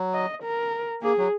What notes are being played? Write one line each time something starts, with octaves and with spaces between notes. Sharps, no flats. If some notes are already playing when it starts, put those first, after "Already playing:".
Already playing: F#3
D#5
A#4
A#3 G#4
F#3